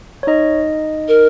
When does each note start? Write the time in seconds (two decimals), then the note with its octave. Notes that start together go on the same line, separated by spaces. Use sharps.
0.23 C#5
0.27 D#4 D#5
1.08 A#4